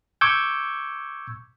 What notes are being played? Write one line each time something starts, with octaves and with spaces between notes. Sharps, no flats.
C#6 D6 E6 G6 G#6